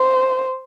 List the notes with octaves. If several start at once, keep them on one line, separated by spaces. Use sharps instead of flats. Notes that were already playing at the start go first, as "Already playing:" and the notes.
Already playing: C5